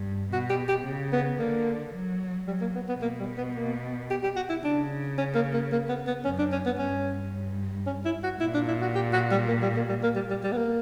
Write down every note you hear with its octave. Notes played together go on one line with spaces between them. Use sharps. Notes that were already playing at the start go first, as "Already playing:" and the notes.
Already playing: G2
B2 F#4
G4
G4
C#3
B3
D3 A#3
F#3
F#3 G3
A#3
B3
B3
B2 A#3
G3
B3
A#3
G4
G4
F#4
E4
C#3 D4
C#4
A#3
A#3
A#3
B3
B3
F#2 C#4
D4
C#4
B3
G2 C#4
C#4
E4
F#4
A#2 E4
D4
E4
F#4
G4
F#4
G3
A#3
G3
A#3
G3
A#3
G3
G3
G3
B3
A#3